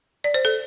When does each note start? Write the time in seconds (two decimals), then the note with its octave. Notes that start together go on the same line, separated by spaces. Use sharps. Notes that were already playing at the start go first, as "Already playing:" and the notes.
0.24 D5
0.34 C5
0.45 A4